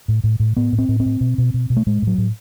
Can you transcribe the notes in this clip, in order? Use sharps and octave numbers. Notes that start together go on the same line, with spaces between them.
A2
A2
A2
A2 B3
A2
C4
A2
C4
A2
B2
B2
B2
B2
A3
A2 G#3
A2
F#3
A2